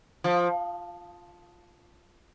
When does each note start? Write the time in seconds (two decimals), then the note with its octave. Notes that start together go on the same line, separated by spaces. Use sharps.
0.24 F3